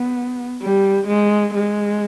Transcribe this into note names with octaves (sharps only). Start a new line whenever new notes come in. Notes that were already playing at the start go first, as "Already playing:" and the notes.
Already playing: B3
G3
G#3
G#3